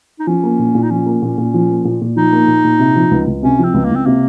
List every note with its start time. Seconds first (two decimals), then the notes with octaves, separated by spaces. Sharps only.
0.19 D#4
0.27 F3 C#4
0.43 A#3
0.59 A#2
0.75 A#2
0.83 D#4
0.90 F3 C#4
1.06 A#3
1.22 A#2
1.38 A#2
1.54 F3
1.70 A#3
1.85 A#2
2.01 A#2
2.16 F3 D#4
2.33 A#3
2.48 A#2
2.64 A#2
2.79 C3
2.96 F3
3.11 C#2
3.27 C#2
3.43 C3 C#4
3.59 F3 C4
3.74 C#2
3.85 A#3
3.91 C#2
3.96 C4
4.06 C3 A#3